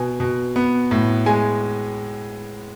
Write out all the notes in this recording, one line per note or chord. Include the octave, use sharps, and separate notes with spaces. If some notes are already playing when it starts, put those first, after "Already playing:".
Already playing: B2 G#5
B2
B3
A2
G#3 G#5